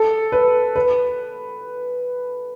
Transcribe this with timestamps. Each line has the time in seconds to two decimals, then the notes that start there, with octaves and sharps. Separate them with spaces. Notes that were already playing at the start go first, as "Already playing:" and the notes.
Already playing: A4
0.32 B4
0.76 B4